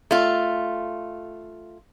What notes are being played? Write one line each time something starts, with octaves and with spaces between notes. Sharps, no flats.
A3 F4